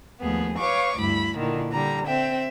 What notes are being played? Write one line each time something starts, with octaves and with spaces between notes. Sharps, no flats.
D#2 F3 A3 B3 G#4
B4 C#5 F5 C#6 D6
D2 G2 E4 B5
A#2 D3 D#3 E4
D3 G3 A#5
C4 E5 G5